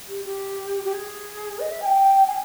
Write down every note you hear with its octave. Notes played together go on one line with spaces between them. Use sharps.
G4
G4
G4
G#4
D#5
E5
G#5
G5
G#5